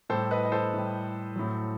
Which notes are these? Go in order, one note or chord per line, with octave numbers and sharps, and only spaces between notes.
A2 G3 A4 C5
B4 D#5
D#5
A4 C5
A2 G3
A2 F#3